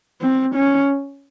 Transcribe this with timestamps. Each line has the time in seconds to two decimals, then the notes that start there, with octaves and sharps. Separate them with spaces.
0.21 C4
0.55 C#4